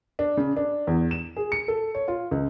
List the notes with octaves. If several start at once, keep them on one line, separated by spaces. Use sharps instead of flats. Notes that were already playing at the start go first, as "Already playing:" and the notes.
D4
C#3
D4
E2
E7
G#4
C#7
A4
C#5
F4
C#2